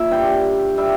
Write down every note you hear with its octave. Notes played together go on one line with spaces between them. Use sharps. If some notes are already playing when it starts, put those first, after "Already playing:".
Already playing: A#2 E5
G2 G3 G5
G3 E5